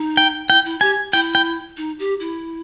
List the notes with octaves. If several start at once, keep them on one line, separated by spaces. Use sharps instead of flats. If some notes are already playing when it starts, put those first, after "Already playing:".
Already playing: D#4
G5
E4 G5
E4
G4 G#5
E4 G5
G5
D#4
G4
E4